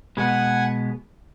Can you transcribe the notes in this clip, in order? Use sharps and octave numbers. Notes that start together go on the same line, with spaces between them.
B2 G#3 B3 F#5 G#5